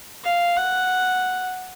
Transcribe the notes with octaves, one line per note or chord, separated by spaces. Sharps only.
F5
F#5